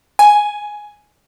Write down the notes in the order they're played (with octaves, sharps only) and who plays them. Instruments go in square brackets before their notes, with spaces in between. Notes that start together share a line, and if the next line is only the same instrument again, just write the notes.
[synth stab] G#5